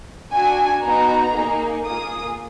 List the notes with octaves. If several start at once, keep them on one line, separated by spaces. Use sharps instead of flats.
D4 F#4 G#5
B3 D#4 F#4 A#5
A#3 D#4 G#4
A#3 F4 G#4 D#6